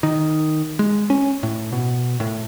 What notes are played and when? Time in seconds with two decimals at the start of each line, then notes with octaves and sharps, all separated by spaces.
0.03 D#3
0.79 G#3
1.10 C#4
1.43 A2
1.72 B2
2.20 A2